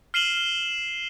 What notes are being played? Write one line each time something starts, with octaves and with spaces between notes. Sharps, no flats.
F6 C7 D#7 E7 F#7 G7